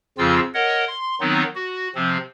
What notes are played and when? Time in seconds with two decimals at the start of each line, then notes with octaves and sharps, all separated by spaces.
0.18 F2 C#3 F3 C4 F4 E6
0.54 A#4 C#5 D#5 F#5
0.88 C6
1.21 D#3 F#3 B3 C4 D#4
1.55 F#4
1.95 C3 F3 C4